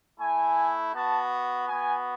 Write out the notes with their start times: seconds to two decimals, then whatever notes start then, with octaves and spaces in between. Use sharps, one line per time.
0.20 A3 E4 G#5
0.94 B3 F#4 A5
1.67 B3 F#4 G#5